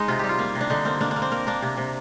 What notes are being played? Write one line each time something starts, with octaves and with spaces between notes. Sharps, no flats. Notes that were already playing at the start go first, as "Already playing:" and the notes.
Already playing: G#3 D#4
C3 F4
G3 G4
F4
A#3
C3
D4
D3 D#4
A#3 C4
A#3 D4
D4
A#3
C4
A#3 A#4
A#3 D4
C3
C3